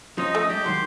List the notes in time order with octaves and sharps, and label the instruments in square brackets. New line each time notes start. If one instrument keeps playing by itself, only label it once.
[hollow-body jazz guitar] F3 C#4 [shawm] D#4 [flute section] D#5 D#6
[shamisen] A3
[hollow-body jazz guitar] G2 G#3 D4 [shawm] G4
[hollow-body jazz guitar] D#3 F#3 G#3 [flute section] C6